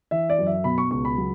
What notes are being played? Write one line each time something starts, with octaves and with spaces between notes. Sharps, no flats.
E3 E5
D5
F#2
E5
B2 B5
C#6
C#2 C#6
B5
F#3